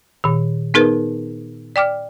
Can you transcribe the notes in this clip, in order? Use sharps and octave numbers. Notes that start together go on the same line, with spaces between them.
A#2 D#3
B3 D#4 G#4 A#4 B4
D5 G5 D6 F6